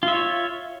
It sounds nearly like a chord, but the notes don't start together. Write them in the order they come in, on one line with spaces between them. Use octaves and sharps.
F4 E5 C#5